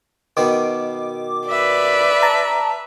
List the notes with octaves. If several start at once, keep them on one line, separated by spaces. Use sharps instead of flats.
B2 D#3 D6
B4 D5 E5
A5 A#5